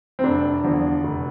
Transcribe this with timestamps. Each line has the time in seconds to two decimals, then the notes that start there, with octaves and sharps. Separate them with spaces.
0.19 C4
0.24 F1 D4
0.64 E2 D3 F3
1.04 F1